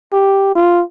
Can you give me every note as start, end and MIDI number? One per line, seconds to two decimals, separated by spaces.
0.13 0.55 67
0.55 0.82 65